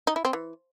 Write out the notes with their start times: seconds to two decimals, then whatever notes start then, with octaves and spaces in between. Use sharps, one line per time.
0.07 D#4
0.16 E4
0.25 C4
0.33 E3